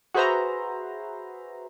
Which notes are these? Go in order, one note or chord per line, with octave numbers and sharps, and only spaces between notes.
F#4 G#4 B4 C5 E5 A#5